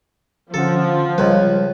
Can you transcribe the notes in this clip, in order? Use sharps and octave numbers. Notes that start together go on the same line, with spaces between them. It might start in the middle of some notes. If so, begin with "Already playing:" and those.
D3 F3 C#4 A4 F#5
C#2 G3 G#3 B4